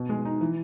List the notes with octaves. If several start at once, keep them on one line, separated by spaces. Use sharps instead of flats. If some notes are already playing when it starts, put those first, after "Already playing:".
Already playing: B2
G#3
D#4
E3